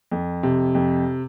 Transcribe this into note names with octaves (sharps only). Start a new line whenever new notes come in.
F2
C3
F2